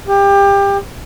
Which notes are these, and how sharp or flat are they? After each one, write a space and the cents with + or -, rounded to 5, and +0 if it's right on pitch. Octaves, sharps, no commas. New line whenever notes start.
G4 +25